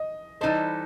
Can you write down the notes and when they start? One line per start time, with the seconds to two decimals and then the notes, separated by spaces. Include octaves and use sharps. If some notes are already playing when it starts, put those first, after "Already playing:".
Already playing: D#5
0.41 E3 G3 D#4 A4 C5 D#5